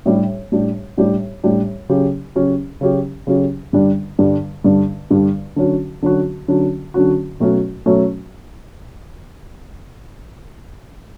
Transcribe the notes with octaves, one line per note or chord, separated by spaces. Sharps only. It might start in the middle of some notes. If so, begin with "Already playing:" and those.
A2 G3 D4 G4
A2 G3 D4 G4
A2 G3 D4 G4
A2 G3 D4 G4
C#3 F#3 C#4 G4
C#3 F#3 C#4 G4
C#3 F#3 C#4 G4
C#3 F#3 C#4 G4
G2 D3 G3 D4
G2 D3 G3 D4
G2 D3 G3 D4
G2 D3 G3 D4
D3 F#3 C#4 F#4
D3 F#3 C#4 F#4
D3 F#3 C#4 F#4
D3 F#3 C#4 F#4
B2 F#3 A3 C#4 F#4
B2 F#3 A3 C#4 F#4